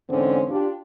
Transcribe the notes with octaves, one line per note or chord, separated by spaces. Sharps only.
E2 G#2 D3 C4 C#4 C5
D4 F4 G4